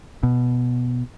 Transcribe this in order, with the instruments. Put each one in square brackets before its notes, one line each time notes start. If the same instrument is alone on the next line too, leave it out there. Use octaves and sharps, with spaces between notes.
[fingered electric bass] B2